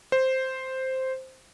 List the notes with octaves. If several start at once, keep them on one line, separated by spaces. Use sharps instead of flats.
C5